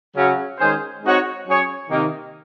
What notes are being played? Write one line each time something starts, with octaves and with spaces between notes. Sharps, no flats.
C#3 F#3 C#4
D#3 G#3 C#4 G#4 C5
G#3 C4 D#4 F#4 C#5
F#3 C#4 G#4 C#5
C3 D#3 A#3